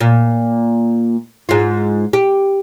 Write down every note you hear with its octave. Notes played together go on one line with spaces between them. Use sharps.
A#2
G#2 F4
G4